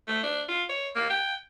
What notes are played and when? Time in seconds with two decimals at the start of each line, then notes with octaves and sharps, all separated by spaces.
0.08 A3
0.23 D4
0.48 F4
0.69 C#5
0.95 A#3
1.10 G5